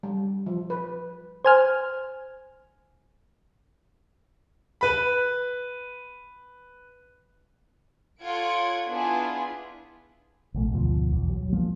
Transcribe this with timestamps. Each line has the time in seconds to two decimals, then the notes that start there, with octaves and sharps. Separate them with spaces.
0.03 G3
0.46 F3
0.70 B4
1.45 C5 G#5 F6
4.81 B4 B5
8.22 F4 A4 C#5 F#5 G#6 D7
8.88 B3 D4 E4 F4 G#4 B4
10.54 A#1 B2 A3
10.72 D2 G#2 B2 F3
11.12 B1 E2
11.30 F#3
11.53 F3 G#3 A#3